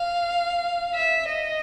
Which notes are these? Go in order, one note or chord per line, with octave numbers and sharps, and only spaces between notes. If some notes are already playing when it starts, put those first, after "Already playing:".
Already playing: F5
E5
D#5